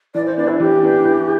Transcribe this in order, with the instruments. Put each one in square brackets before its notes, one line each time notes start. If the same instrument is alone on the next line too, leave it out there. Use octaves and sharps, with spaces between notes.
[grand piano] E3 [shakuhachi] D5
[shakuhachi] C5
[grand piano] B3 D4 [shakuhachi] D5
[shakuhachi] E4
[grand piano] E3 [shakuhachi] G4
[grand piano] B3 D4
E3